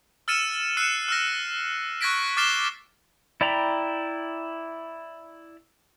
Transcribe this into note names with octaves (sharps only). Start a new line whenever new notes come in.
E6 F6 A6 C#7 D#7 E7
E6 F#6 C7 C#7 D#7 E7
E6 F6 A#6
C#6 F#6 G#6 A#6 B6 D7
D6 F6 A6 C7 E7 G7
E4 D5 G5 A#5 B5